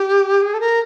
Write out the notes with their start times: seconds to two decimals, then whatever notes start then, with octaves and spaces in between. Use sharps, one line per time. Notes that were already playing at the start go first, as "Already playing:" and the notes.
Already playing: G4
0.42 G#4
0.54 A4
0.60 A#4